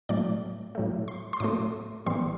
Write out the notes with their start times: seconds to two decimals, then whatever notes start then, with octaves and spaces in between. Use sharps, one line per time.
0.09 A2 F#3 A3 D5
0.75 A2 F#3 A3
1.08 C6
1.33 C6
1.40 A2 F#3 A3 D6
2.06 A1 A2 E3 G3 B3 C6